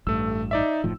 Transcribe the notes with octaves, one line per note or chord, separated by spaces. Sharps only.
A1 G2 A3 E6
D#4 D5 E5
F#1 A2 F3